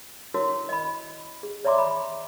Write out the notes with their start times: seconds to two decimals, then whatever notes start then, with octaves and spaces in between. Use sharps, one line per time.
0.34 E4 F#4 A#4 C#5
0.69 D#5 B5
1.43 G#4
1.65 C#5 D5 E5 A#5 C6 D6
1.78 B5